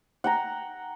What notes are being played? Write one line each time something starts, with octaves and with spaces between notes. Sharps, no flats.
F#5 G5 A#5